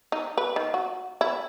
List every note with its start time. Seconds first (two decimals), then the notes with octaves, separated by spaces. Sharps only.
0.12 D#4
0.38 B4
0.56 D#3
0.74 F#4
1.21 E4